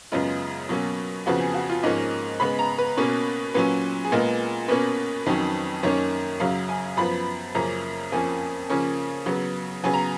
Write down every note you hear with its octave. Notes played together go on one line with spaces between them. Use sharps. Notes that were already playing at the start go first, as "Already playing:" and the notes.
F#2 C#3 G#3 B3 F4
B2 F#3 A#3 C#4
F2 C#3 F3 B3 F#4
G#4
F#4
F4
G#2 F3 A#3 C#4 D#5
C#3 G#3 B3 B5
A#5
B4
B2 A#3 C#4
A#2 F#3 C#4 B4
G#4
A#2 G#3 B3 A#4
B2 A#3 C#4 B4
F2 D#3 F#3 C#4
F#2 D#3 A#3 C#4 C#5
F#2 C#3 F#3 F5
G#5
F#2 F3 B3 B5
F#2 C#3 F3 A#3 C#4 A#5
F2 F3 A#3 C#4 G#5
C#3 F3 A#3 C#4
C#3 F#3 B3
C#3 F#3 B3 G#5
A#5